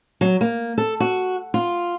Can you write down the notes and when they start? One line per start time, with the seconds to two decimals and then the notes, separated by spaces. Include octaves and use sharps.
0.21 F#3
0.41 A#3
0.78 A4
1.00 F#4
1.54 F4